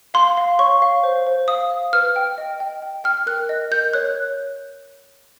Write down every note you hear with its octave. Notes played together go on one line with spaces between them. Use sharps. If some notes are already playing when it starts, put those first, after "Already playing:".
F5 C6
F5
C#5 C#6
F5
C5
C5
F5 D#6
F5
B4 F6
G5
D#5
G5
G5
G5 F6
A#4 F#6
D#5
A#4 G6
C#5 F#6